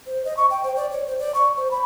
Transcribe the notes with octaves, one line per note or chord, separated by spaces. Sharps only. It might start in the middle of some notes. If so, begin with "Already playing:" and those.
C5
D#5
C#6
G5
C5
D5
C#5
C5
D5
C#6
C5
B5